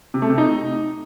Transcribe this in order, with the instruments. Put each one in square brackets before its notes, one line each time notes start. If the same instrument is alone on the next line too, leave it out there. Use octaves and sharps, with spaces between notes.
[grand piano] C3
A3
C3
D#4